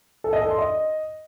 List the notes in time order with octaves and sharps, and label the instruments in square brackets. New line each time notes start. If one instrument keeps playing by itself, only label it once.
[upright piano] A4
D#5
A4
C6
D#5